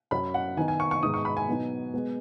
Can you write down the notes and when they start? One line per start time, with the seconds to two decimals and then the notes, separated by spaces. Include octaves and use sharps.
0.11 F#2 F#3 C#4 B5
0.34 F#5
0.57 D#3 B3 D#4 G#5
0.68 G#5
0.80 C#6
0.91 C#6
1.03 G#2 D#3 G#3 B3 D#4 D#6
1.14 C#6
1.25 B5
1.37 G#5
1.48 B2 F#3 B3 D#4
1.94 B2 G#3 B3